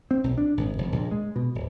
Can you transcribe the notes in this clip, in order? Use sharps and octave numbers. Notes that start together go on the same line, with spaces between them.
C4
B1
D4
G#1
F1
A#1
G#3
B2
D1